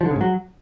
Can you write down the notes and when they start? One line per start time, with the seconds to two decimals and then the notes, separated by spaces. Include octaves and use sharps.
0.01 F3
0.06 D3
0.11 C#3
0.16 G#2
0.21 F#3